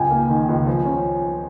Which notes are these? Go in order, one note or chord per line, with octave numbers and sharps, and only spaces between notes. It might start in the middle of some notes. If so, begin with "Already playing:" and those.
Already playing: C#2 G5 G#5
A#3
D#3
C#2
F3
C#4